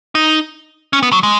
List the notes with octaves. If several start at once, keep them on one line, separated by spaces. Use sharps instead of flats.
D#4
C#4
B3
F#3
G#3